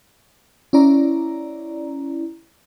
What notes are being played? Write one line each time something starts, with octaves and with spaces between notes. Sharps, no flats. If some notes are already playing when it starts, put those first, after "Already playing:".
C#4 E4 D5 A#5